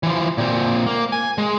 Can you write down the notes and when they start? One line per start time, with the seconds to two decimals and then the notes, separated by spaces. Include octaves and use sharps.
0.03 E3 F3
0.38 A#2 C4
0.86 A#3
1.12 G#5
1.38 G#3